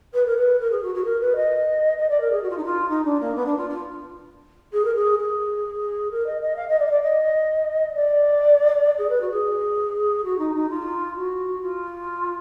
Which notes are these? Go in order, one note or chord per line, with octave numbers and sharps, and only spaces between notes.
B4
A#4
B4
A#4
G#4
F#4
F#4
A#4
B4
D#5
D#5
D5
A#4
G#4
F#4
F4
D#4
F4
D#4
D4
A#3
B3
D4
F4
F4
G#4
A#4
G#4
G#4
A#4
D#5
D#5
F5
D#5
D5
D#5
D5
D#5
D5
G#4
B4
F#4
G#4
F#4
D#4
D#4
F4
F#4
F4